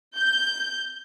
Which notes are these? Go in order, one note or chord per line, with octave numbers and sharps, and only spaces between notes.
G6